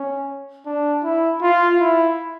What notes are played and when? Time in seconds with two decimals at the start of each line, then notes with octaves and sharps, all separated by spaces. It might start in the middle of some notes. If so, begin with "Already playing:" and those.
Already playing: C#4
0.66 D4
1.04 E4
1.42 F4
1.80 E4